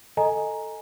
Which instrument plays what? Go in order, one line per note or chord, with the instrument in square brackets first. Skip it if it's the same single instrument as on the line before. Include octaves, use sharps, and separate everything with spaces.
[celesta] A4 D#5 G#5 A#5